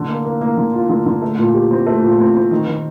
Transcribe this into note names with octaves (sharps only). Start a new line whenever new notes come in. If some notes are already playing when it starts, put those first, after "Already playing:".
Already playing: D3
A#3
A#3
A#3
D3
F4
D3
D3
A3
A#2
G4
C4
A3
A#2
C4
C4
D#3
D#3